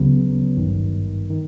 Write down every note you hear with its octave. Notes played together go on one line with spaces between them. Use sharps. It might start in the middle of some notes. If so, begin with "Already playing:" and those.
Already playing: D2 C#3 F#3 B3
G#1 G2 D#3
D#3